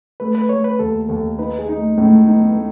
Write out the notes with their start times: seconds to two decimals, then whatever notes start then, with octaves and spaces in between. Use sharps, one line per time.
0.20 A3 B4
0.35 B4
0.49 A3 C#5
0.64 B4
0.79 D#2 A4
1.09 D#2 A4
1.39 D#4 B4
1.59 G#4
1.69 D#4
1.78 A3
1.97 A2 G#3
2.07 A3
2.13 G#3
2.27 B3 D#4
2.36 A3
2.41 B3
2.51 G#3
2.56 A3